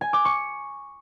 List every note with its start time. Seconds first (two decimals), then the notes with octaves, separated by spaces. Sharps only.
0.01 G#5
0.13 D6
0.25 C#6